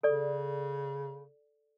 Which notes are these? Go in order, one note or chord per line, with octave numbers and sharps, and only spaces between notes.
C#3 A4 D5